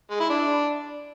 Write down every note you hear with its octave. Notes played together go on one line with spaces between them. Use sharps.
G#3
E4
D4